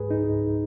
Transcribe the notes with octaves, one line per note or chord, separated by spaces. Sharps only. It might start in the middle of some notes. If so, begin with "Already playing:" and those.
Already playing: C#2 G#2 G#4 B4
D#4